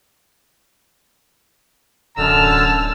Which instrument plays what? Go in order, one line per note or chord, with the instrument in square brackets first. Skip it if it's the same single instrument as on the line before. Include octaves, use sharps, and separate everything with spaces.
[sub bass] D1 [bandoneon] F#2 D3 [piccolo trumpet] A5 [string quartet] E6 F6